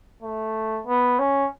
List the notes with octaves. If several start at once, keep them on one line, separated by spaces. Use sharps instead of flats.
A3
B3
C#4